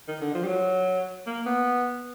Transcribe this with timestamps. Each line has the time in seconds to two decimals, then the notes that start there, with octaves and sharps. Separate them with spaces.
0.08 D#3
0.21 D3
0.35 F3
0.44 G3
0.48 F#3
1.26 A#3
1.46 B3